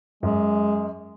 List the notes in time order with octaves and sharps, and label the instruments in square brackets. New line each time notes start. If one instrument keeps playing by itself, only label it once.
[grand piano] F#2 [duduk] G#3